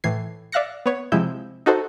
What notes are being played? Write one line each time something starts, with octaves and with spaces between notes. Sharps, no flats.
A2 E3 G#6 C7
D5 E5 F5 F#6 A#6 C#7
B3 C#5
C3 F3 G#3 E4 E5 G6
D#4 F#4 A4 C5